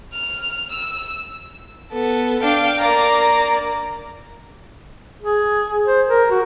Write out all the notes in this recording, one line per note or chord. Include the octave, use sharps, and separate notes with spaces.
F6
E6
B3 A4
D4 F5 G5
A#3 D5 A#5
G#4
C5
A#4
F#4